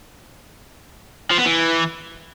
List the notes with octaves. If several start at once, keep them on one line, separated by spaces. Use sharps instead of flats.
F3
B3
E3